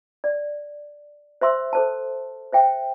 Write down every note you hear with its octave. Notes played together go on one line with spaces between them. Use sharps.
D5
C5 E5 C6 E6
A4 C5 A5
C5 E5 G5